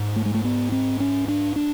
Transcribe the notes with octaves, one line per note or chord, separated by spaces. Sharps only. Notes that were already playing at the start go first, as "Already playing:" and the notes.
Already playing: G#2
A3
G#3
A3
B3
C4
C#4
D4
D4